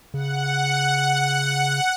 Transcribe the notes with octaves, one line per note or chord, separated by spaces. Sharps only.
C#3 F#5